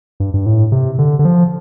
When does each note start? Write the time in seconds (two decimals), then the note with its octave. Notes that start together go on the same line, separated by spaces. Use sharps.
0.20 G2
0.34 G2
0.46 A2
0.72 C3
0.99 D3
1.19 D3
1.25 F3